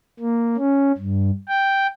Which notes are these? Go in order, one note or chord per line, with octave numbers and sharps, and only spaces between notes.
A#3
C#4
G2
G5